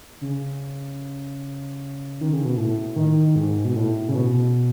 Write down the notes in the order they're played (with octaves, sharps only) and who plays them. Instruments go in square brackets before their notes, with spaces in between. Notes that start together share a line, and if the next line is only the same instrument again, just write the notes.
[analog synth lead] C#3
D#3
C#3
B2
A2
D#3
G#2
B2
A2
C#3
B2